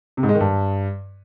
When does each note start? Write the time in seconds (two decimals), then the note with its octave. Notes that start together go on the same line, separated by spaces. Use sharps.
0.17 C3
0.23 G#2
0.29 G#3
0.35 D#3
0.40 G2